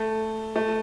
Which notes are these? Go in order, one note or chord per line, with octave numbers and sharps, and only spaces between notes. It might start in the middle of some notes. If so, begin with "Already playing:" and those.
Already playing: A3
A3